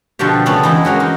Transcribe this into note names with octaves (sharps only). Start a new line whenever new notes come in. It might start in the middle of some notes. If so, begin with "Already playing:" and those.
B2 D3 F3 F#4 G4
C#3 A3 B3 C#4 A5
E3 G#3 D#4 E4
G#3 A#3 C#4 F#4
D#4 A#4